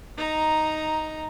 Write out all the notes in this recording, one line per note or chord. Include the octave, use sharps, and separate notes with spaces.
D#4 A#5